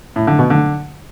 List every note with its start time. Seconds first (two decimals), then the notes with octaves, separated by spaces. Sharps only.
0.16 A2
0.27 D3
0.39 B2
0.50 D3